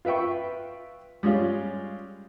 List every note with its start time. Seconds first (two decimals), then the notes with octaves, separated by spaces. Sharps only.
0.05 F4 B4 E5 G5 C#6
1.23 G3 G#3 C#4 F4